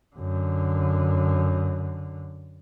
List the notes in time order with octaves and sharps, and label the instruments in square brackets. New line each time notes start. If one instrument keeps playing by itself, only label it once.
[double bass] F#2 D3